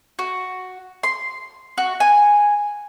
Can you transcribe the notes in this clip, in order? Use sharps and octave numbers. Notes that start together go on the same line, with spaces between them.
F#4
C6
F#4
G#5